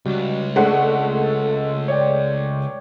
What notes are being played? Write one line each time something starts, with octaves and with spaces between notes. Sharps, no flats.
C#2 G3 F#4
G#3 A3 D4 F#5
A4
C#5 D5 G5